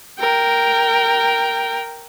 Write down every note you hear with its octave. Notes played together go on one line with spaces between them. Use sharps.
A#4 G5